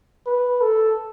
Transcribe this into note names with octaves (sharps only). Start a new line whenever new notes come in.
B4
A4